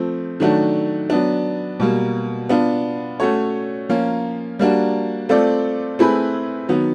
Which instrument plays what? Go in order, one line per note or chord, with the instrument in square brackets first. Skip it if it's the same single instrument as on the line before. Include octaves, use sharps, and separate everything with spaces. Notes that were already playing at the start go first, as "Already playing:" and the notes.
Already playing: [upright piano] F3 A3 C4
D#3 F#3 A3 D4 F#4
F#3 B3 D4
B2 G3 A#3
B3 D4 F4
A3 C#4 F#4 A4 C#5
F3 A#3 C#4 F4
G3 A#3 D4 F#4
A3 C4 F4 A4 D5
A3 C4 E4 G#4 B4
D#3 F#3 B3